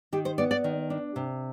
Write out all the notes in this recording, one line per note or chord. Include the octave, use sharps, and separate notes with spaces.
D#3 G4
C5
B3 D5
D5
D#3
D4
C3